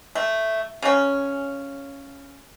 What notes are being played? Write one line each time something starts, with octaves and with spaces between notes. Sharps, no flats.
A3
C#3 C#4